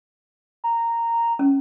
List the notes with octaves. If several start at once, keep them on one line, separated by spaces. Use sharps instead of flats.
A#5
C#4